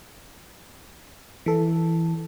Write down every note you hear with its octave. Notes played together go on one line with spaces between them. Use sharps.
E3 A4